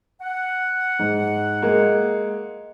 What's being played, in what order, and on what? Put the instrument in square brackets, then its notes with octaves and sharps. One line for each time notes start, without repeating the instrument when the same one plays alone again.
[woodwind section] F#5
[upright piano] G#2
G#3 A#3